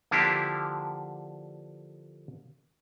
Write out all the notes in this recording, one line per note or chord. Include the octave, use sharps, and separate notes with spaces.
D3 F3 A#3 D4 E4 G4